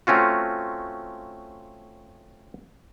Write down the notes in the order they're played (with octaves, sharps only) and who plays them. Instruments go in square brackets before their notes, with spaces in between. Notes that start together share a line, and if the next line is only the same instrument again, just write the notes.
[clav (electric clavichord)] A3 C4 C#4 F4 F#4